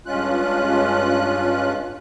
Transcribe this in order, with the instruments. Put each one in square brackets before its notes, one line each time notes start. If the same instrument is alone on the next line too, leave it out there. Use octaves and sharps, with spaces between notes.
[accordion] G2 G#3 C#4 F4 F#6